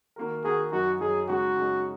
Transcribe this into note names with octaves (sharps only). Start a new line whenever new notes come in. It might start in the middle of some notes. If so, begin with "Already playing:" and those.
D#3 A#3 F#4 A#4
D#3 A#3 F#4 G#4 A#4
F#2 F#3 D#4 F#4
F#2 F#3 D#4 G#4
C#3 G#3 D#4 F#4
C#3 G#3 D#4